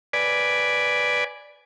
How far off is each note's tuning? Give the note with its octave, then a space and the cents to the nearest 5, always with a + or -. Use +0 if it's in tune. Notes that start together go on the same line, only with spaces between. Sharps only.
B4 +0 D5 +0 G#5 +0